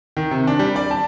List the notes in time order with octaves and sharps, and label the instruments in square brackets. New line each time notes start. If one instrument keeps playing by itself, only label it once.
[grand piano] D#3
C3
D4
G3
D5
A5